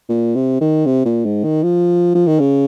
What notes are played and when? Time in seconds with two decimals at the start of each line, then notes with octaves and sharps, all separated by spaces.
0.09 A#2
0.35 C3
0.61 D#3
0.86 C3
1.05 A#2
1.25 G#2
1.44 D#3
1.63 F3
2.15 F3
2.27 D#3
2.40 C#3